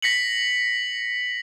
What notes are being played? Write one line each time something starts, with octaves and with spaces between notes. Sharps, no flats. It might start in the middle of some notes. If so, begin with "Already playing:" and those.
A#6 B6 C#7 F#7